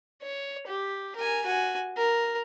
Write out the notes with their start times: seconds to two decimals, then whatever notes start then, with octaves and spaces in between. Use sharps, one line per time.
0.22 C#5
0.67 G4
1.16 A#4 G#5
1.45 F#4 G#5
1.97 A#4